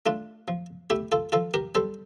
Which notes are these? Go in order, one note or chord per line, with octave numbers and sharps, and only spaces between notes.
A3 D4 F4
F3
A3 E4 G4
F4 A4
F3 F4 A4
G4 A#4
G3 A4 C5